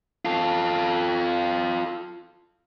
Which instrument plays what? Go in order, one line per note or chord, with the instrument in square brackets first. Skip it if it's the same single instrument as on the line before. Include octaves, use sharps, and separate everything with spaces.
[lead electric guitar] F4 A4